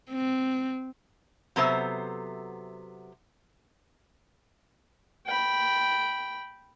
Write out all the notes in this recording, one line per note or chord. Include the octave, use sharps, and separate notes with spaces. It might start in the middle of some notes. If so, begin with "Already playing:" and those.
C4
C3 F#3 B3 A4 C5 E5
G5 B5